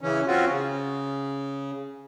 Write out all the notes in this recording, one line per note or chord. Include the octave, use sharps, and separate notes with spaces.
C#3 E3 C#4
C4 C#4 F4 F#4
C#3